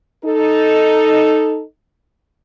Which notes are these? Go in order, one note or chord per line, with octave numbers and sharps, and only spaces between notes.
D#4 A4